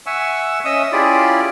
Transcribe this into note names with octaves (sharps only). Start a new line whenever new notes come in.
E5 F#5 G#5 C#6 E6
C#4 D#5 E5 D#6 E6
C#4 E4 F4 G4 G#4 D5